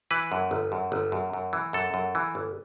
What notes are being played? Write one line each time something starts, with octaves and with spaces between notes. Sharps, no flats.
E3 B4
F#2
G1
F#2
G1
F#2
F#2
E3
F#2 A4
F#2
E3
G1